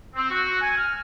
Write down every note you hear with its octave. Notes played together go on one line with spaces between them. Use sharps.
C4
F#4
G#5
F6